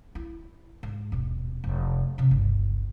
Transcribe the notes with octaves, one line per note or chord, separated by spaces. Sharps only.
E4
G#2
D#1 B2
F1
C3 C#4
G1 C#2